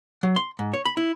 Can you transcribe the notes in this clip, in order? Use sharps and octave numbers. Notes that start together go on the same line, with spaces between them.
F#3
C6
G#2
C#5
B5
E4